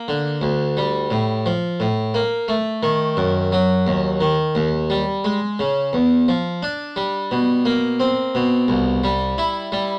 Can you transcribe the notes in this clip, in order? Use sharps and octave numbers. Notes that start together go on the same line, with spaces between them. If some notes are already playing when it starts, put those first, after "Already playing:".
Already playing: A#3
D3
D2
G3
A2
F3
A2
A#3
A3
D#3
F#2
F#3
D#2
D#3
D#2
G3
G#3
C#3
E2
F3
D4
G3
B2
A#3
C4
B2
C2
G3
E4
G3